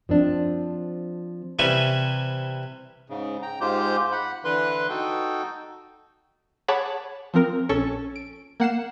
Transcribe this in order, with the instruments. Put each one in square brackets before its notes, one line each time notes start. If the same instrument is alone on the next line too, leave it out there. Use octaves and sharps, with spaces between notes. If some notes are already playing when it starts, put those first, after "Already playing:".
[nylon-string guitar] F3 C4 D4
[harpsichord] C3 E3 G3 E5 G#5 C#6
[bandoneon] G#2 C#3
G5 A#5
G#2 G#3 F4 G4 C5 G6
F#5 B5
D3 E3 B4 C6 F#6
D#4 F#4 A4 G5
[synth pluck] G#4 C#5 F#5 A5 B5 D6
F3 C4 A#4
A#1 C#4 A4 C#6
D7
A#3 F#5 C7 E7